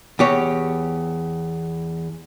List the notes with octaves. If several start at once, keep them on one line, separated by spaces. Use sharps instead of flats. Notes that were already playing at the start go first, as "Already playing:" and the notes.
E2 G4 C#5